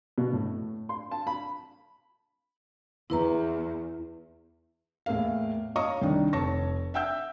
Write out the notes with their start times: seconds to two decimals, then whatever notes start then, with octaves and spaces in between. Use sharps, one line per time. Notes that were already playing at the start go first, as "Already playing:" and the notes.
0.18 B2
0.33 A2
0.89 C6
1.11 A5
1.27 B5
3.10 E2 E4 B4 A#5
5.06 E2 A2 A#3 F5
5.76 C#5 D#5 F5 A#5 C#6 D#6
6.01 C2 D#3 D4
6.33 F1 C#5 A5 C#6 A#6
6.94 E5 F#5 G5 E6 G6